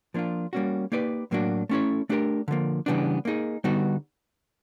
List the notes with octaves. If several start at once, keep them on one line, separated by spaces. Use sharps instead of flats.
F3 A#3 D4 F4
G3 A#3 C#4 F#4
A#3 D#4 G4 B4 D5
A2 F#3 A#3 D4 F#4
A3 C#4 E4 A4 C#5
A3 D4 G4 A#4
D3 F3 A#3
C#3 E3 G3 B3 D4
A#3 D#4 G#4
D3 G3 B3 D#4 F#4